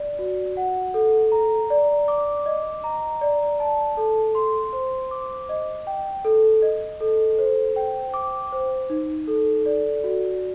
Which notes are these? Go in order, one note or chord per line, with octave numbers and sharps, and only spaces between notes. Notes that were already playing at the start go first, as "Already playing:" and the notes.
Already playing: D5
F#4
F#5
A4
A#5
D5
D6
D#5
A#5
D5
A5
A4
C6
C5
D6
D#5
G5
A4
D#5
A4
C5
G5
D6
C5
D#4
A4
D5
F#4